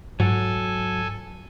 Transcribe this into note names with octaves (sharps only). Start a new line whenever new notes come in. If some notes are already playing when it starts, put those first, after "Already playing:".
G#2 F#3 A4 G#5